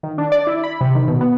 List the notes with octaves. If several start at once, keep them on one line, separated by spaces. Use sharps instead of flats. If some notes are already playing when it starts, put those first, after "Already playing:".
D#3
D4
D5
E4
B5
C3
D#3
B2
B3